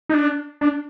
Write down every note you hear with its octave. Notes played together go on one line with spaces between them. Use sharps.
D#4
D4
D4